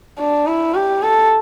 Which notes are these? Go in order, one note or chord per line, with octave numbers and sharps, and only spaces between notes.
D4
E4
G4
A4